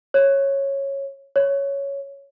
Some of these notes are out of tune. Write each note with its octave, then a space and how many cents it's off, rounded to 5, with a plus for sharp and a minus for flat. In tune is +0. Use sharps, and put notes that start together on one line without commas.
C#5 -10
C#5 +5